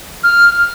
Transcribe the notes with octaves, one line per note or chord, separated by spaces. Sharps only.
F6